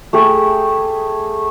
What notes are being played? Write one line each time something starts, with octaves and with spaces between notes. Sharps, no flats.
A3 G4 G#4